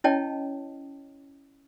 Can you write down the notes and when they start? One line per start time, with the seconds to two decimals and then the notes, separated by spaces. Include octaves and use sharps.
0.04 C#4 E4 C#5 D#5 G5 A5